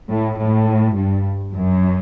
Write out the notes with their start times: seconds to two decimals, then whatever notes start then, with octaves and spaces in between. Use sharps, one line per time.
0.10 A2
0.39 A2
0.96 G2
1.54 F#2